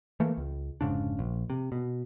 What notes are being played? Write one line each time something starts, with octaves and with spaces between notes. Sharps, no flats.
E3 A3 A#3
C#2
F1 G#2 C#3 D4
A#1
C3
B2